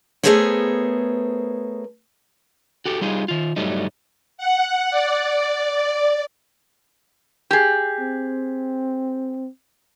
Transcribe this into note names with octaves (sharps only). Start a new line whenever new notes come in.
A3 B3 G#4 A#4 C5 C#5
F#4 G4 A4
G3 D#4 F4 G#4
D#3 F4
G2 F#3 G3 A3 D#4
F#5
D5
G4 G#4
C4